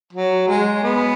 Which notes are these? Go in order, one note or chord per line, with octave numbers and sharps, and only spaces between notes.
F#3
G#3
B3